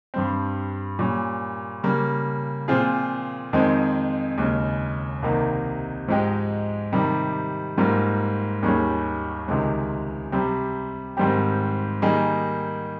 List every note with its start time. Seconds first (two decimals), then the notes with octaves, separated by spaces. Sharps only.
0.14 G2 G3 C4
0.99 A#2 G3 C#4
1.83 C#3 G3 A#3
2.68 A#2 F3 C4 F4 G#4
3.53 F2 D#3 G#3 C4 D#4
4.38 D#2 C#3 G#3
5.22 C2 C3 D#3 A#3 D#4
6.08 G#2 F3 G#3 D#4 G4
6.93 C3 D#3 G3
7.77 G#2 G3 A#3 F4
8.63 D#2 D#3 G3 C#4 G#4
9.48 C#2 C3 D#3 G#3 C4
10.32 C3 G3 C4
11.17 G#2 D#3 G3 C4 G4
12.02 D#3 G3 A#3 D#4 G#4